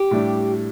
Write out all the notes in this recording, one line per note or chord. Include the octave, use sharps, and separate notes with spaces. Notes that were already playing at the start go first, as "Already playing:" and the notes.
Already playing: G4
A2 G3 D4